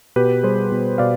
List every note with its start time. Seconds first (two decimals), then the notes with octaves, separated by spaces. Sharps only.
0.16 B2 G4 B4
0.43 G3 G#4 C5
0.72 B2
0.98 B2 D5 F5